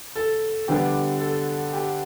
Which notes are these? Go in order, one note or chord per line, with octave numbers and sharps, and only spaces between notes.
A4
D3 G3 B3 D4 G4
A4
G4